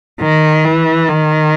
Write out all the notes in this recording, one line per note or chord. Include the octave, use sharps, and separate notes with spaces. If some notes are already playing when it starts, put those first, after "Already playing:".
D#3
E3
D#3